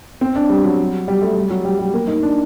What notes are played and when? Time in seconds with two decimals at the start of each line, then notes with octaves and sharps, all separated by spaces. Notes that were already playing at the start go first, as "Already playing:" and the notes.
0.21 C4
0.36 D4
0.49 G3
0.64 F#3
1.08 G3
1.22 A3
1.36 G3
1.50 F#3
1.65 G3
1.79 G3
1.94 A#3
2.07 D#4
2.23 D4